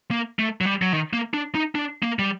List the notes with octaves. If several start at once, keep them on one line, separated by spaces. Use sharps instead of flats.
A#3
A3
F#3
G3
F#3
D#3
A#3
D4
D#4
D4
A#3
G3